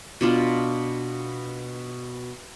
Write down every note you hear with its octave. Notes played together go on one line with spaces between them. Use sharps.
B2 D4 F4